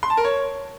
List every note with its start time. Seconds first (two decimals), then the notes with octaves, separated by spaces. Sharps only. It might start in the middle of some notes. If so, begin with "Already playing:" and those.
0.03 C6
0.10 A5
0.17 A#4
0.25 C#5